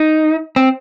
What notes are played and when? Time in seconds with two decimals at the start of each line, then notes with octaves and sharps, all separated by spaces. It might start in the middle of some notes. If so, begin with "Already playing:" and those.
Already playing: D#4
0.56 C4